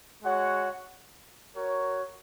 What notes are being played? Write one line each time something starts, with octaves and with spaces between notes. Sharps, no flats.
G#3 F#4 C#5 F#5
F#4 A#4 C#5